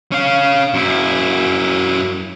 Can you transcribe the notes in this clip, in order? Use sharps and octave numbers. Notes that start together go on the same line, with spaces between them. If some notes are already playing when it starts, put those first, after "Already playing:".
C#4 F5
F#2 E4